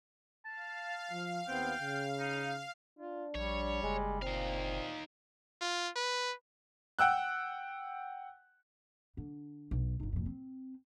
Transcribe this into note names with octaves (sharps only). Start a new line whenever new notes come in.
F5 A5
F3
D#2 B3 C4 G5
C#3
D#4
D4 F4
A#1 G3 C#5
F#1 G#3
A#2 C4 D#4 F5
F4
B4
F#5 G5 E6 F#6
D3 D4
B1
G1 D#4
F2 A#2
C4